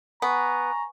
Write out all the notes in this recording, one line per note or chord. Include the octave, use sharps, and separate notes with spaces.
B3 G#5 A#5 C#6